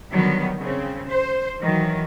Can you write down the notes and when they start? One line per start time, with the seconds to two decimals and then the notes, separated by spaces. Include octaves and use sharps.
0.12 D3 D#3 F#3 G3 B3
0.59 C#3 C4
1.09 C5
1.61 D#3 E3 F#3